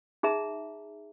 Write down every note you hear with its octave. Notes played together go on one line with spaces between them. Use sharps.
D#4 G#4 E5 A#5